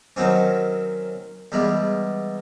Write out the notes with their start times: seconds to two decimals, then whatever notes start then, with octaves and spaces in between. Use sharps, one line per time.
0.16 D#3 F#3 C4 C#4
1.52 E2 G3 G#3